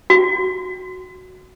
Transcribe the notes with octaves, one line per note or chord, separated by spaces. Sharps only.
F#4